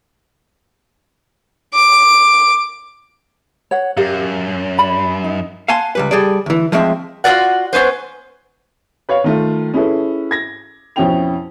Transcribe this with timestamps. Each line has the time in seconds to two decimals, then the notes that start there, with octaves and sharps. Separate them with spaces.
1.74 D6
3.71 C#5 F#5
3.97 F#2 G4 A#4 F5
4.78 D5 B5
5.24 D#4
5.68 F5 F#5 G#5 A5 C6
5.95 C#2 G3 B4
6.11 G3 G#4 A4 D5
6.46 D2 E3
6.72 F3 G#3 A3 C4 C#5 E5
7.24 F4 F#4 G#4 A4 D5 F#5
7.73 B3 C#4 B4 C5
9.09 B4 C#5 F5
9.24 D#3 A3 F4
9.74 C#4 E4 G#4 A4 B4
10.31 G#6 A#6
10.96 F2 B2 C#4 E4 G5 F7